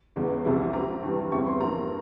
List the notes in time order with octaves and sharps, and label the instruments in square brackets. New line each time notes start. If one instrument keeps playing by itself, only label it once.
[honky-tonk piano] E2 C#3 E3 G#3
C2 C3 F3 G#3 E4
C3 F3 C4 A#5
G2 E3 G3
E2 C#3 G3 C4 E4 C#6
C6
G2 F3 A#3 E4 A#5